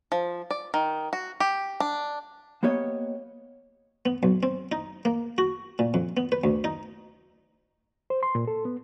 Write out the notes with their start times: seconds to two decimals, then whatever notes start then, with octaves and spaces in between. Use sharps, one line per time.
0.12 F3
0.50 D5
0.74 D#3
1.13 F#4
1.40 G4
1.80 D4
2.63 A#3 B3 G4 C#5 D#5
4.06 B3
4.23 B1
4.43 C4
4.72 D#4
5.05 A#3
5.38 F#4
5.79 A#2
5.94 F2
6.17 B3
6.32 B4
6.44 D2
6.64 D#4
8.10 C5
8.23 C6
8.35 A#2
8.47 A4
8.65 B3